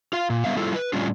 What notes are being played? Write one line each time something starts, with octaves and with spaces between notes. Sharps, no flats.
F4 F5
A#2
D3 G3 B3 E5 F5
G3 E4 F4 A4
B4
A2 G3 C#4 D4 F4